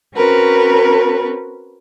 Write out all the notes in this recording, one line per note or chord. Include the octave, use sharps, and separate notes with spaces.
C4 C#4 F#4 A#4 B4